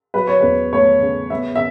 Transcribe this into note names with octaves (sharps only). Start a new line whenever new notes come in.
F#3 B4
C#5
E2 B4
A3 C#5
C#3
B3 E5
E5